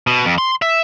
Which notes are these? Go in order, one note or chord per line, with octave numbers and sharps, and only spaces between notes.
B2
F2
C6
E5